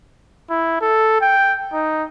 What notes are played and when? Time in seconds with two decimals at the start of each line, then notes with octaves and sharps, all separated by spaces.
0.50 E4
0.81 A4
1.21 G5
1.73 D#4